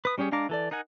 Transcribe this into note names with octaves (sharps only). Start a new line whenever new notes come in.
B4 D#6
G3 C#4 G4 G#4 C#5
G#3 D4 F5 A#5 D6
E3 A4 D5
D#4 A#4 F#5 G#5